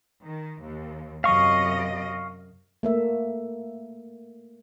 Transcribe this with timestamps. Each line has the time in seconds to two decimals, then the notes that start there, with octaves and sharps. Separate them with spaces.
0.24 D#3
0.61 D#2
1.24 F#2 C3 D#5 F5 C#6
2.83 A3 A#3 E5